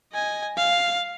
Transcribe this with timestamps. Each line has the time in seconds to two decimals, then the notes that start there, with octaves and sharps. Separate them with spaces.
0.13 D#5 G#5
0.57 F5